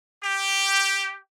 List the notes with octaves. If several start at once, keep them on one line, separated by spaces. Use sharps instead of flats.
G4